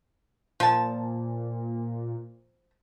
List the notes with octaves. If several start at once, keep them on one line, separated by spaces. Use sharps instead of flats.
A#2 F3 A5